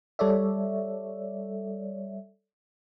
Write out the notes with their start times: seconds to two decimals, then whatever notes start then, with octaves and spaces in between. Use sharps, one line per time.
0.19 G3 A4 C#5 D5 E5